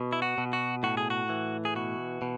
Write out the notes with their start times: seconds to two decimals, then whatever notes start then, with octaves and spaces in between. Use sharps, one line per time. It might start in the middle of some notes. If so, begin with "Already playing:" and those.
Already playing: B2
0.13 E4
0.22 F#4
0.38 B2
0.53 F#4
0.83 A2 F#4
0.97 G#4
1.10 F#4
1.29 E3
1.65 G#4
1.75 B2 F#4
2.22 B2